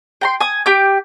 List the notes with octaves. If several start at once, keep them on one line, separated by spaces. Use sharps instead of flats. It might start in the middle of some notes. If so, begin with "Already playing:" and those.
G5 A#5 C6
G#5 D#6
G4 G5 D6 G6